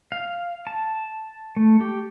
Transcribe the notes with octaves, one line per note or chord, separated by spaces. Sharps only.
F5
A5
A3
G4